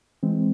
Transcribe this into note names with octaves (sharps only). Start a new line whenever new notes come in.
E3 G#3 C4